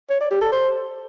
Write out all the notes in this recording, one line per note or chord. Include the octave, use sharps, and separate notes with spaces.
C#5
D5
G4
A4
C5